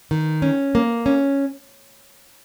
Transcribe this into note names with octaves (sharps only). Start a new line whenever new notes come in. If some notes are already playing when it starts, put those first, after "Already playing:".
D#3
C#4
A#3
C#4